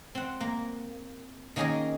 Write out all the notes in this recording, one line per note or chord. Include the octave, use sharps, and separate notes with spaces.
C4 F#5
A#3
D#3 A#3 C#4 G#4 A#4 D#5